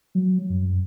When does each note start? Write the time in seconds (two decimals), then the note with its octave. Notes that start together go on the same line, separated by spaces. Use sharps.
0.15 F#3
0.50 F#2